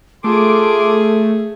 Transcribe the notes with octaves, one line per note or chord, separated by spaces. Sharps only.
A3 F4 G#4 A4 C6 D6